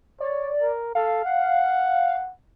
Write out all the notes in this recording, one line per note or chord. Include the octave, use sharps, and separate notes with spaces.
C#5 D5
A#4
A4 F5
F#5